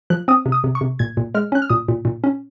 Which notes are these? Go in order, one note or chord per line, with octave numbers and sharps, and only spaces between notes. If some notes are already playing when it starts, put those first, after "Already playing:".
F3 F#6
C4 D#6
C3
D#6
C3
C#6
C3
A#2 G#6
A#2
G#3 F6
C#4 F#6
F6
A#2 D#6
A#2
A#2
C#4